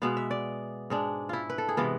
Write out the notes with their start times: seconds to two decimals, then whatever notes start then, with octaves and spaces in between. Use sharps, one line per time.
0.02 B2 G#3 B3 F5
0.17 E5
0.31 D5
0.90 G#2 G#3 D4
1.29 E4 F4
1.50 B4
1.58 A4
1.69 G#4
1.77 C3 E3 G#3 B3 F4